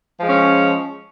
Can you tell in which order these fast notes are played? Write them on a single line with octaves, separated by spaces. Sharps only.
F3 G#3 C#4